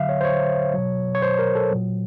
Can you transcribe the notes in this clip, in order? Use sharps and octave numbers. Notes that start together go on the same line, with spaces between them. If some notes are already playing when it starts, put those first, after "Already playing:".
Already playing: D3 F#3 E5 F5
C#5
C5
C#5
B2 F#3
C#5
C5
A#4
A4
A#2 F#3